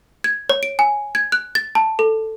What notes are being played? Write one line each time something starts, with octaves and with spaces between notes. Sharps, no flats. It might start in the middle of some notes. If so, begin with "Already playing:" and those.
G#6
C#5
D7
G#5
G#6
F#6
A6
A5
A4